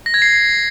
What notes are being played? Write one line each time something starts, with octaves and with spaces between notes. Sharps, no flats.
A#6
G#6
C7